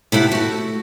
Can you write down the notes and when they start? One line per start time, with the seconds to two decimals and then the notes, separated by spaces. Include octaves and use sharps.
0.12 C3 E4 G4 F#5 A5
0.32 A3 F#4